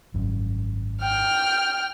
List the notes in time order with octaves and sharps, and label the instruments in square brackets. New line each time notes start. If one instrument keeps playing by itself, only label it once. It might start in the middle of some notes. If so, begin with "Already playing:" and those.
[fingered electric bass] G#1 F#2
[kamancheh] G5 F6